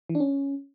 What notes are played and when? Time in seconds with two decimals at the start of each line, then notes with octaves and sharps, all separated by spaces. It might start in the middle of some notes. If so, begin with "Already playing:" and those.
0.09 E3
0.15 D4
0.20 C#4